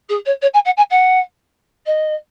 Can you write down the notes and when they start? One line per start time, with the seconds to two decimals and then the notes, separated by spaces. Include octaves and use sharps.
0.09 G#4
0.25 C#5
0.41 C#5
0.53 G#5
0.65 F#5
0.77 G#5
0.90 F#5
1.86 D#5